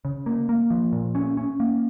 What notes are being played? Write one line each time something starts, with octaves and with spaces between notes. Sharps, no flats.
C#3
A#3
A#3
F3
A#2
C#4
C#4
A#3